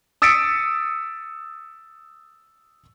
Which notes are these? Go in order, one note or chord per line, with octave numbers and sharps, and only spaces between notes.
D#6 E6 A6 B6 C#7 D7